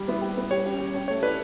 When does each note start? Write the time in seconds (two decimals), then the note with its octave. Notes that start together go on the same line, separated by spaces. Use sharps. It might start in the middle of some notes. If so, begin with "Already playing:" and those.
Already playing: G3
0.08 B3 E4
0.21 G3
0.37 B3 E4
0.51 G3 C#5
0.65 C#4 G4
0.79 G3
0.94 C#4 G4
1.08 A3 C#5
1.22 E4 A4 B4 D5